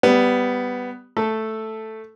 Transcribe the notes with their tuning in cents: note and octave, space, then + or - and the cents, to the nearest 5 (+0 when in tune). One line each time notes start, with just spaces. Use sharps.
G3 +0 B3 +10
A3 +0 A4 +0